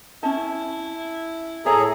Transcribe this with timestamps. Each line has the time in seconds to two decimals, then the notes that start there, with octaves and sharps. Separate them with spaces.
0.23 C#4 E4 A5
1.66 A2 G#4 A4 C#5 E5 A#5